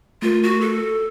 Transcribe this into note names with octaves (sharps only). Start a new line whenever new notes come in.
A3 F4 A#4
F#4
A4